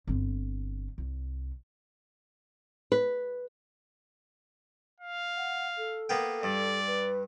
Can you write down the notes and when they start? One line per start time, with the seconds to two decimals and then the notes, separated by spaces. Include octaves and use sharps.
0.07 G1 C4
0.98 C2
2.92 B4
5.00 F5
5.36 F#5
5.78 A4
6.09 A#3 B3 G5
6.43 G2 D5
6.87 B4